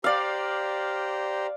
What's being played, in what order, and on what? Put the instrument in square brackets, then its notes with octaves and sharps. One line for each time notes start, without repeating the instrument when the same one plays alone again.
[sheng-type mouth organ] G4 C5 A#5 [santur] D5 F5